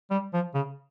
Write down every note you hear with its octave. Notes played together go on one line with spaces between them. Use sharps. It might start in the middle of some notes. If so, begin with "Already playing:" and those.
G3
F3
C#3